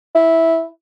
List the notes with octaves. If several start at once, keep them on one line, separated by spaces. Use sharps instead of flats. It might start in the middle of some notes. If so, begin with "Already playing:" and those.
E4